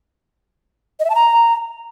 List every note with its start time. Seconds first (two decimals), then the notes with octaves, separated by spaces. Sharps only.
1.00 D#5
1.05 E5
1.10 A5
1.15 A#5